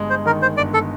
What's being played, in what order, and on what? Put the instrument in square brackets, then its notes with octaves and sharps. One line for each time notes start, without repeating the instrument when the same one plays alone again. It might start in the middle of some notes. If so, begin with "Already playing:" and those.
Already playing: [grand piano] G1 G#3
[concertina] C5
[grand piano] D#3 [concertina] A#4
[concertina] C5
[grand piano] G1 [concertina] D5
[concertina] A4